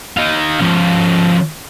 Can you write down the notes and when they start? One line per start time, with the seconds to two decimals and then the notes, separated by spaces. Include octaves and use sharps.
0.17 D#4 F5
0.61 F3 C#4